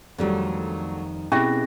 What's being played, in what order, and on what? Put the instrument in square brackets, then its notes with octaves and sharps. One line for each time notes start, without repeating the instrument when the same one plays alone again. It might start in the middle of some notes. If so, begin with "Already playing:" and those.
[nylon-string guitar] F2 D#3 G3 [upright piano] F#3 A3 D4
[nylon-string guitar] B2 [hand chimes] C4 G#4 A#6 [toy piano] C#4 G4 E5 [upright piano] E4